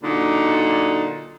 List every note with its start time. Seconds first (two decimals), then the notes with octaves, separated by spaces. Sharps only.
0.03 A#2 D3 F#3 D#4